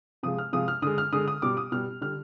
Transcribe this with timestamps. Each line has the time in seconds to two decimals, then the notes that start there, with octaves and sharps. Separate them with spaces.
0.23 C3 F3 G#3 D#6
0.38 F6
0.53 C3 F3 G#3 D#6
0.68 F6
0.82 D3 G#3 D#6
0.98 F6
1.13 D3 G#3 D#6
1.28 D#6
1.42 B2 G3 D6
1.57 D#6
1.72 B2 G3 F6
2.01 D3 G3 F6